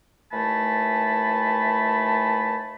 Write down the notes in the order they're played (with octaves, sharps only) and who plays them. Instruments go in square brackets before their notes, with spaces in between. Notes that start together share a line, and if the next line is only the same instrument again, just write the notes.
[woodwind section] D#2 E3 A3 G#5 A5 B5